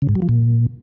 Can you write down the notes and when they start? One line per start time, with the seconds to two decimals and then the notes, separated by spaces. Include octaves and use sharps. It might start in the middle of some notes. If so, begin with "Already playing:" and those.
0.02 C#3
0.09 G#2
0.15 F#3
0.22 F3
0.29 A#2